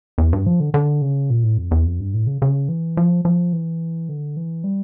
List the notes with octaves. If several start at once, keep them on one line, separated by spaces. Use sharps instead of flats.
E2
G2
F3
D3
D3
C#3
A#2
A2
F2
E2
F2
G2
A2
C#3
C#3
E3
F3
F3
E3
D3
E3
G3